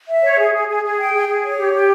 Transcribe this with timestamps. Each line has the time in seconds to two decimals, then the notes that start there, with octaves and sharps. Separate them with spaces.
0.08 E5
0.23 C#5
0.38 G#4
0.53 G#4
0.68 G#4
0.83 G#4
0.98 G5
1.14 G#4
1.28 G#4
1.43 C#5
1.58 G4
1.72 G4